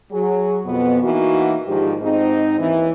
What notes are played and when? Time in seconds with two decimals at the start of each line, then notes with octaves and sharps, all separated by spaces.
0.12 F#3 G#4
0.64 F2 B2 B3
1.02 E3 A#3 D#4 F#4
1.66 G#2 D#3 F3 D4 G4
2.01 G#2 C4 D#4
2.59 D#2 E3